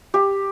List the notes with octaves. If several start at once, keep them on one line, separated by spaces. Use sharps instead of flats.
G4